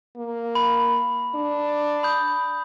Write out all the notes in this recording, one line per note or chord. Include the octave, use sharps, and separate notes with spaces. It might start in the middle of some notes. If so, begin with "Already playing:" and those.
A#3
B5
D4
B5 D#6 G6